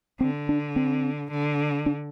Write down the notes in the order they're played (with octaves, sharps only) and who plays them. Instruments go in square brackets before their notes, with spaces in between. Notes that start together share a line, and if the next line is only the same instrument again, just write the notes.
[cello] D3 [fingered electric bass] C4
[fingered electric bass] D4
C4
[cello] D3
[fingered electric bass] D4